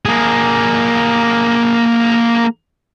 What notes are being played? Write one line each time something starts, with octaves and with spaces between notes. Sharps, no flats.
A#3 G#4